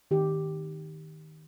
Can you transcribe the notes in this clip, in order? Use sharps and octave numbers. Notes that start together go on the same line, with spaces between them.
D#3 G4